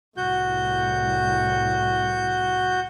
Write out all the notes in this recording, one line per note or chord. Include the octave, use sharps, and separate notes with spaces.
C2 A2 F#4 G6